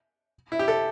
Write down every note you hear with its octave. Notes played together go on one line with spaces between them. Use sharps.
E4
G4
A4